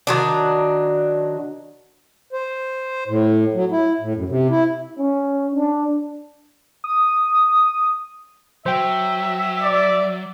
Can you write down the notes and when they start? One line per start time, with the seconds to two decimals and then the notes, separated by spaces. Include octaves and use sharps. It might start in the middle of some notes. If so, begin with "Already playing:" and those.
0.07 D#3 F#3 D4
2.33 C5
3.08 A2
3.54 F#3
3.71 E4
4.00 A2
4.15 F#2
4.29 C3
4.50 E4
4.98 C#4
5.55 D4
6.84 D#6
8.66 F#3 C5 E5 G5
9.61 D5